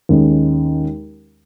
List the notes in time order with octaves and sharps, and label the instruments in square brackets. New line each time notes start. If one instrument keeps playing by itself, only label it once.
[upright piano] D#2 D#3 G#3 C#4